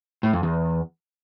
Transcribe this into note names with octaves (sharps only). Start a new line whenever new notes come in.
A2
F2
E2